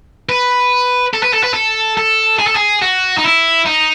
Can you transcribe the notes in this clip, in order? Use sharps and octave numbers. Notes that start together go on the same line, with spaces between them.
B4
A4
B4
A4
B4
A4
A4
G#4
A4
G#4
F#4
D#4
E4
D#4